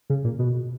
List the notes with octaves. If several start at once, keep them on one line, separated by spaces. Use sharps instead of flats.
C#3
A#2
B2